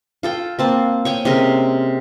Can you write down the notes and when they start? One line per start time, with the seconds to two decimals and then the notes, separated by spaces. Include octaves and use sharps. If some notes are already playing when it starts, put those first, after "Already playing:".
0.23 F4 A4 G5
0.59 A#3 C4 A5
1.05 C#5 G5 G#5
1.25 C3 G#3 C#4 A#4